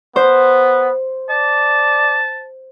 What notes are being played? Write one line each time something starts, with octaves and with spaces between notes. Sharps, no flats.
B3 C5
D5 A5